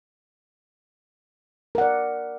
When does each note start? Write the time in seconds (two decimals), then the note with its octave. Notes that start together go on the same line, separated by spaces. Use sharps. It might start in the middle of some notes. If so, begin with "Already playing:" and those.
1.75 A#4
1.78 F#5
1.81 D5